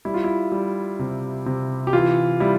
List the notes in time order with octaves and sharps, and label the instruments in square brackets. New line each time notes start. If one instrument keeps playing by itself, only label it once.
[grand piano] G3 E4
F4
E4
G3
C3
C3
G4
E3 F4
G3 E4